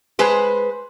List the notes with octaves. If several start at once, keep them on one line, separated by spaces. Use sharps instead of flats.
G#3 B4 C5